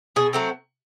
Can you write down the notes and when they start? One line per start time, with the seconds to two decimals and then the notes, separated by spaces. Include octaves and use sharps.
0.16 B2 G#4
0.33 F#3 A3 C4